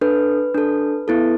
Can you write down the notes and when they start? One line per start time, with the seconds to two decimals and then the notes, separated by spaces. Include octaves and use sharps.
0.01 D4 A4 B4
0.55 D4 A4
1.08 B3 E4 A4